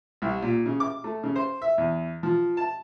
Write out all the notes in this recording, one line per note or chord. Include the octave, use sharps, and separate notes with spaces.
C2
A#2
C#3
D6
A3
C#3
C5
E5
E2
F3
A5